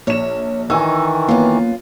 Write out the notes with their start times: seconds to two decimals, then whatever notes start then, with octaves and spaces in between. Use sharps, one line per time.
0.07 A#1 C#5 E7
0.70 D#3 E3 D#4 G#5 C#6 E6
1.28 F#2 A#3 B3 F4